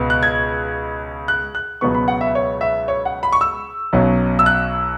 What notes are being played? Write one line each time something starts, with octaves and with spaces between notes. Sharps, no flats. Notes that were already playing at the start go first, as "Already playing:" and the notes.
Already playing: C#2 B2 B3
F#6
G#6
F#6
F#6
C#2 B2 F#3 B3 C#6
B5
F#5
E5
C#5
E5
C#5
F#5
B5
C#6
E6
B1 B2 F#3 C#4
E6
F#6